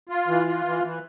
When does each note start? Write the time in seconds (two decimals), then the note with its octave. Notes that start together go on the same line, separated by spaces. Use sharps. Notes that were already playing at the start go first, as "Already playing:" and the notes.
0.09 F4
0.28 E3
0.47 F4
0.65 E3
0.84 E3